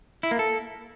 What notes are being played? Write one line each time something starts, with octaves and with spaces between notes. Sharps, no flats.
E4
A#3
A4